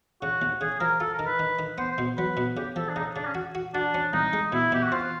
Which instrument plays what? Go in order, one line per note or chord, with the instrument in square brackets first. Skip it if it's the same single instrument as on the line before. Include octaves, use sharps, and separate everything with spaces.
[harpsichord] C#3 [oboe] F#4
[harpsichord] D#2
[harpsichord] C#3 [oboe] G#4
[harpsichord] F3 [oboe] A#4
[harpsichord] F4 [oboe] A4
[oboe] A#4
[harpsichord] D#3
[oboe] B4
[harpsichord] D#3
D#3
[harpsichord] B3 [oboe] C5
[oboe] C5
[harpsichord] B2
[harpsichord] F#3 [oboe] B4
[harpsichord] B2
[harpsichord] C#3 [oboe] G4
[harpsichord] F3 [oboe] A4
[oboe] D4
[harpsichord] C#3 [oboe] D#4
[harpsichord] C#3 [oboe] D4
[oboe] C#4
[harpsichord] F#4
F#4
[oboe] D4 [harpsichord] F#4
[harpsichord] C#4
[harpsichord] C2 [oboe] D#4
[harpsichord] G#3
[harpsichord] B2 [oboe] E4
[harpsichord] B2 [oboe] G4
[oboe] F#4
[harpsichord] C4 [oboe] F4